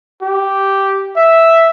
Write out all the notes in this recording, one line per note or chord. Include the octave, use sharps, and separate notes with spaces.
G4
E5